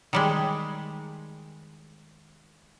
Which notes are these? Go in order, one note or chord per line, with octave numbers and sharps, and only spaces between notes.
D#3 G3 G#3